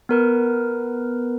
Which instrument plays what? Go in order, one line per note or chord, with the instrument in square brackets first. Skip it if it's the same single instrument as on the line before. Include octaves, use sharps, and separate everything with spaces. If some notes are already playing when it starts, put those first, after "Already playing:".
[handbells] B3 A#4 B4